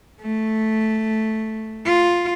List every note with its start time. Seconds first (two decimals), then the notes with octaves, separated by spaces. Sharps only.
0.21 A3
1.86 F4